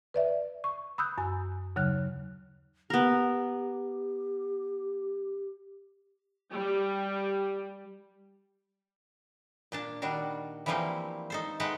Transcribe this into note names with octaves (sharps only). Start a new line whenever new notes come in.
B4 D5 E5
C#6
B5 D#6 E6 F#6 G6
F#2 G#5
D#2 C#3 F#3 F6 F#6
B3 G4 A#4
G3
A#2 D4 A5
D#3 G3 D4 F#4
E3 F3 G3 A3 A#3 C4
D#4 A4 C5
G#3 A3 D#4 B4 F#5 G5